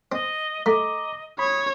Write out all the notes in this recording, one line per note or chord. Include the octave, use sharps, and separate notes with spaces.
C4 D#5
A3 D#5 A#5 D6
C#5 B5 D#6